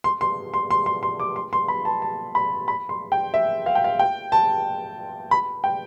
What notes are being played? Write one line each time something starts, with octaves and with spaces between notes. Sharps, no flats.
C6
C6
C6
C6
C6
C6
D6
C6
C6
B5
A5
A5
B5
B5
C6
G5
E5
F5
G5
F5
G5
A5
B5
G5